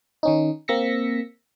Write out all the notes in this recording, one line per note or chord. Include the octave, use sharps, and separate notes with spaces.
D#3 C#4 D#4
A#3 C4 E6 A#6 B6 C#7